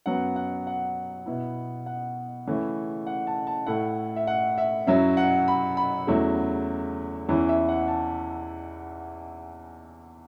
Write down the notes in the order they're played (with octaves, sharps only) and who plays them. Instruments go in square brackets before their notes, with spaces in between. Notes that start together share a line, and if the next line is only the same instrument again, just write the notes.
[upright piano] F#2 F#3 B3 F#5
F#5
F#5
B2 B3 E4
F#5
C#3 E3 A3 C#4 E4
F#5
A5
A5
A2 A3 E4 F#5
E5
F#5
E5
F#2 F#3 C#4 E4 E5
F#5
B5
B5
E2 C#3 F#3 A3 E4
E2 E3 C#4 E4
E5
F#5
A5